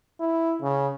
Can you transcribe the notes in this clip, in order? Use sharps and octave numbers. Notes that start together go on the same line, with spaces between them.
E4
C#3